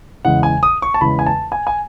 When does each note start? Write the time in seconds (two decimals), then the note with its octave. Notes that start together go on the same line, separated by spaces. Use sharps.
0.25 E2 C#3 E3 G#3 F#5
0.43 G#5
0.63 D#6
0.82 C#6
0.94 A5
1.01 E2 C#3 E3 G#3 B5
1.19 G#5
1.27 A5
1.52 G#5
1.67 G#5